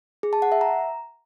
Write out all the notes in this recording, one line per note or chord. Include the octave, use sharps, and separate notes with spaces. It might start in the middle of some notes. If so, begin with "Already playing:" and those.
G#4
A5
F#5
E5
A#5